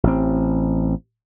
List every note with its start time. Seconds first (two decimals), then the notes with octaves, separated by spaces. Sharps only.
0.04 A1 C4